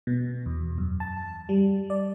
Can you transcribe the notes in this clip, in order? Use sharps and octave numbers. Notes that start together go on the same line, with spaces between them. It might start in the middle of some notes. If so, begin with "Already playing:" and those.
B2
E2
F#2
A5
G3
D5